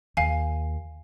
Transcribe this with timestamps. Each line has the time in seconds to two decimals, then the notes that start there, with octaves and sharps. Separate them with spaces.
0.17 D#2 F5 G#5